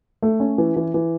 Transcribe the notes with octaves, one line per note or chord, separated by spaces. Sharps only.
A3
C#4
E3
E3
E3